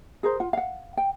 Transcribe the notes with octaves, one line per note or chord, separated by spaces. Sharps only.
G#4 A#4 C5
F4 F#5
F5 F#5
G5